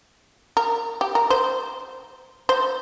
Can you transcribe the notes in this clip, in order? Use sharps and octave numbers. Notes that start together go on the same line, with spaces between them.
A#4
G4
A#4
C5
C5